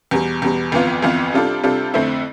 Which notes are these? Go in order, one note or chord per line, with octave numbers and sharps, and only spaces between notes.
E2 B2 G3
E2 B2 G3
G1 F2 E3 B3 F4
G1 F2 E3 B3 F4
C3 G3 D4 F4 A4
C3 G3 D4 F4 A4
F2 D3 A3 C4 E4